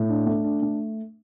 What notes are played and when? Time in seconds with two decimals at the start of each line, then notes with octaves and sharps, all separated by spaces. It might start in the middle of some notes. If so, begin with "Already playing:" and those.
Already playing: A2
0.09 D4
0.26 A3
0.44 D4
0.62 A3